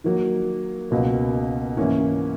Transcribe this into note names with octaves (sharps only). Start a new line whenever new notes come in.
D#3 F#3 A#3
C#2 B2 A#3
G#2 E3 A#3 C#4